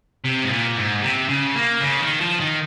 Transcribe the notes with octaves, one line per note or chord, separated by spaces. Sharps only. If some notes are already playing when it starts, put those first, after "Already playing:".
C3
G#2
A#2
G#2
C3
C#3
A#3
C#3
D#3
F3
D#3